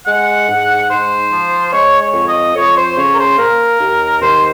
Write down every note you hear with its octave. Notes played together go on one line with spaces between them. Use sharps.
G#3 F#5
G#2
G#2 C5
F3
G#3 C#5
C#5
F2
D#5
F2 C#5
C5
C#3 C#5
A#4
C5
A#3 A#4
D#2
D#2 C5